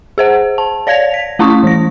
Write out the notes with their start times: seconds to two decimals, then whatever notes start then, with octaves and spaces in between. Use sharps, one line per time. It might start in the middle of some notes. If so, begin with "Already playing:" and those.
0.18 G#4 C5 F#5
0.58 A5
0.87 C#5 D5 F5 G#6 A#6 F7
1.14 B6
1.39 A3 C#4 E4 C#6 D#6
1.64 E3 A#6